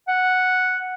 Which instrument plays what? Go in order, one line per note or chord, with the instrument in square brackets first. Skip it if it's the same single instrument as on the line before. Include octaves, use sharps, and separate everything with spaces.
[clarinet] F#5